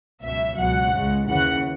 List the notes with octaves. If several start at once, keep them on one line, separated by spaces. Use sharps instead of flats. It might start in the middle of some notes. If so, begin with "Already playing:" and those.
C#2 B2 F#3 E5
C#2 B2 F#3 F#5
C#2 C#3 G#3
D#2 C#3 E3 F#5